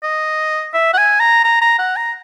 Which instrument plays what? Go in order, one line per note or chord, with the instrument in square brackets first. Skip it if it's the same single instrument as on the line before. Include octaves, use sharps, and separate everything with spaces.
[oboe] D#5
E5
F#5
G#5
A#5
A#5
A#5
F#5
A#5